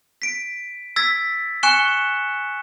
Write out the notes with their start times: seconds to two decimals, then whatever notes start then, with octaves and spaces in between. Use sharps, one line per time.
0.22 B6 D7
0.96 E6 G#6 A6 B6
1.63 G#5 C#6 F#6 C#7 E7 G7